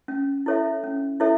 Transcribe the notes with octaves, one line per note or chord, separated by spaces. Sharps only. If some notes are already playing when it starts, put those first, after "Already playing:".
C#4
E4 A4 C#5 E5
C#4
E4 A4 C#5 E5